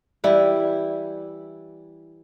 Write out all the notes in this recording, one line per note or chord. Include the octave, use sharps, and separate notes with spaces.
E3 G3 E4